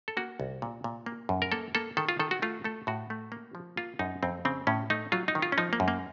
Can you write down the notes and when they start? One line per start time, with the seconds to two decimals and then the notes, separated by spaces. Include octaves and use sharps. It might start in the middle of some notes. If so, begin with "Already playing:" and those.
0.08 A4
0.17 A#3 F#4
0.40 C2
0.62 A#2
0.84 A#2
1.06 A#3
1.29 F#2
1.42 A#4
1.52 A#3 A4
1.75 A#3 A4
1.97 D#3 A4
2.09 F4
2.20 D#3 A4
2.31 F#4
2.42 A3 F4
2.64 A3 A4
2.87 A2 F#4
3.10 A3
3.32 A#3
3.55 F3
3.77 A#3 F4
3.99 F#2 D#4
4.23 F2 C4
4.45 C#3 C4
4.67 A2 C#4
4.90 A3 D#4
5.12 F#3 F4
5.28 D#4
5.35 D#3
5.42 F4
5.52 C#4
5.58 F3 D#4
5.73 A#3
5.80 F#2
5.88 A#3